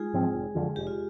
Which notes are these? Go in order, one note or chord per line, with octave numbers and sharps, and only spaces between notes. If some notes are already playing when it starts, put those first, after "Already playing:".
Already playing: G#3 D#4 F4 G#4
G#2 F3 C4
F1
F2 D3 F3
F1 G4
F4